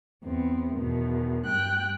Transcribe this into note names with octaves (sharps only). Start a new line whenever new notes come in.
E2 B3 C4
E2 B2 D#3
G2 G5 F#6